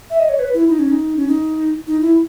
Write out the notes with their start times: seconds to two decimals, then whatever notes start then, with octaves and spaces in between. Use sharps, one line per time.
0.10 E5
0.19 D#5
0.29 C#5
0.39 B4
0.54 E4
0.69 D#4
0.79 C#4
0.89 D#4
1.16 C#4
1.28 D#4
1.87 D#4
2.01 E4